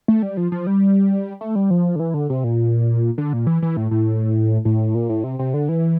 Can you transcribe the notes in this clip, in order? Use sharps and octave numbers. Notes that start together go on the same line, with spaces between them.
A3
G3
F3
F3
G3
A3
G3
F3
D3
E3
D3
C3
A#2
D3
A#2
E3
E3
A2
A2
A2
A#2
A2
C3
C3
D3
E3